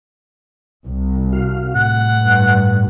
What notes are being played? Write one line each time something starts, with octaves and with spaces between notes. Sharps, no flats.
C2
F#4 F5
A2 F#5
G2